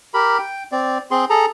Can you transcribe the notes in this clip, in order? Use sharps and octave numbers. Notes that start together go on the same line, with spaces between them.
G4 A#4 B5
G5
C4 D5
C4 G#4 C6
G#4 A4 A#5